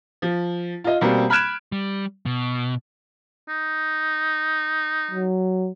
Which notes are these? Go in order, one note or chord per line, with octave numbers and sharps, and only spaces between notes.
F3
F4 D#5
B2 G3 A#3 C4
B5 F6 F#6 G#6 D7 E7
G3
B2
D#4
F#3